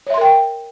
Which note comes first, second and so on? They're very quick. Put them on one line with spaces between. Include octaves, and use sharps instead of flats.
C#5 E5 C6 A#4 G5